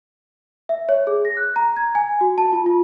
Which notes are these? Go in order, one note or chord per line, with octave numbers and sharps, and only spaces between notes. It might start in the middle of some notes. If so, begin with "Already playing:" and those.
E5
C#5
G#4
A#6
F#6
A#5
G#6
G#5
F#4
A5
F4
F4